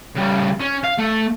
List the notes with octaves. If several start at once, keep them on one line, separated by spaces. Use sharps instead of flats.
C#3 G3
C#4
F5
A3